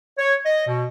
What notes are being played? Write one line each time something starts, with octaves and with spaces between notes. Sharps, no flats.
C#5
D#5
B2